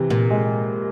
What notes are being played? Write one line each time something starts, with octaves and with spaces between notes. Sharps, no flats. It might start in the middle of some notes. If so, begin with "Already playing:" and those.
Already playing: C3 E3
A#2
G#3